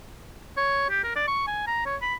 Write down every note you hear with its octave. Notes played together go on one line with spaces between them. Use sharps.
C#5
G4
A#4
D5
C#6
G#5
A#5
C#5
B5